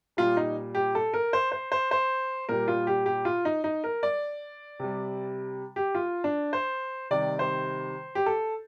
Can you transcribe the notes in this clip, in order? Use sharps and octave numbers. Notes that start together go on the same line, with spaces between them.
A#2 G3 F4
D#4
G4
A4
A#4
C5
C5
C5
C5
A#2 G3 A#4
F4
G4
G4
F4
D#4
D#4
A#4
D5
C3 G3
G4
F4
D4
C5
C3 D#3 G3 D5
C5
G4
A4